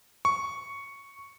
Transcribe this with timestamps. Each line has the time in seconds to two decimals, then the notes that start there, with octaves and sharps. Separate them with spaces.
0.25 C#6